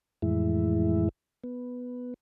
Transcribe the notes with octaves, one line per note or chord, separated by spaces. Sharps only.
F2 A2 E3 G#3 E4
B3